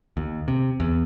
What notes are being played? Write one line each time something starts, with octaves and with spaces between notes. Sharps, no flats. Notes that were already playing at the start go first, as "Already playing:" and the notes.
D#2
C3
E2